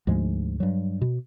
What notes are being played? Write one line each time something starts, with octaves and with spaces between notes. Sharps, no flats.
D2 G#2 F3 G#3
G2 F#3
B2